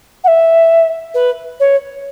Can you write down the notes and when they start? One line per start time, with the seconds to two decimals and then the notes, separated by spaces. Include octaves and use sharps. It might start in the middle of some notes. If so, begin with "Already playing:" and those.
0.24 F#5
0.27 E5
1.14 B4
1.60 C#5